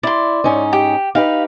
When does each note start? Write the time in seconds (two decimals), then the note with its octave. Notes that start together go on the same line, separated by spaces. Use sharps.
0.03 E4 D5 C6
0.44 G#2 C#4 D#4
0.73 G4
1.15 D#4 G4 B4 F5